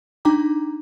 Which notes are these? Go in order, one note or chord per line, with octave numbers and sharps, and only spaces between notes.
D4 D#4 G5 A#5 D6